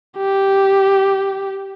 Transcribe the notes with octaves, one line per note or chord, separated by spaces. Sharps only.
G4